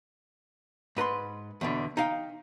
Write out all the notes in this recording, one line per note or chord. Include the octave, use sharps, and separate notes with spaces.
G#2 B4 A#5 C6
E2 B2 D3
D#4 F5 G5